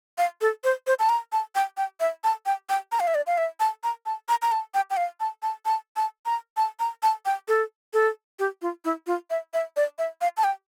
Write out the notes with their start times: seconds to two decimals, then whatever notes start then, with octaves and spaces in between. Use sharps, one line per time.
0.18 F5
0.41 A4
0.64 C5
0.87 C5
0.99 A5
1.09 A#5
1.32 A5
1.55 G5
1.77 G5
2.00 E5
2.24 A5
2.46 G5
2.69 G5
2.92 A#5
3.00 F5
3.07 E5
3.15 D5
3.27 F5
3.38 E5
3.60 A5
3.83 A#5
4.06 A5
4.29 A#5
4.42 A#5
4.52 A5
4.74 G5
4.90 G5
4.97 F5
5.20 A5
5.43 A5
5.65 A5
5.96 A5
6.26 A#5
6.57 A5
6.80 A#5
7.03 A5
7.26 G5
7.48 A4
7.93 A4
8.39 G4
8.62 F4
8.85 E4
9.07 F4
9.30 E5
9.54 E5
9.76 D5
9.99 E5
10.21 F5
10.37 A5
10.44 G5